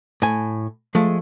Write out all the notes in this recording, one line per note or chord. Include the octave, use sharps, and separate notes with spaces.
A2 G#5
F3 G#3 A3